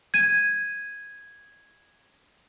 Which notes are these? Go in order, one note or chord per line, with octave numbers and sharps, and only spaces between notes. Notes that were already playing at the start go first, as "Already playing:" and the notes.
G#6 D#7